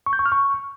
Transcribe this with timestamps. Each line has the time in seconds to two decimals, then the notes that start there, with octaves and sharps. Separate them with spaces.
0.06 C#6
0.13 G6
0.19 C#6
0.26 F6
0.32 C#6